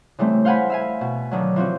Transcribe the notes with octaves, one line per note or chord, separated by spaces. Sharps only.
C#3 E3 G3 A3 C4
C5 F5 F#5 G#5 B5 C6
E5 F5 G#5
B2
D3 D#3 F#3
E3 F3 C4 F#4